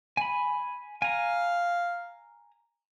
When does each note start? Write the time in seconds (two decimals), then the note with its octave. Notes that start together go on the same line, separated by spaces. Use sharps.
0.17 G#5 B5
1.02 F5 G#5 A#5